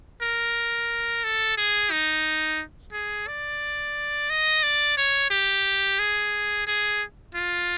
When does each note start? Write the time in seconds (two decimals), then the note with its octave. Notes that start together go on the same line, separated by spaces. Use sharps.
0.22 A#4
1.24 A4
1.57 G#4
1.91 D#4
2.93 G#4
3.27 D5
4.30 D#5
4.63 D5
4.98 C#5
5.31 G4
5.99 G#4
6.67 G#4
7.35 F4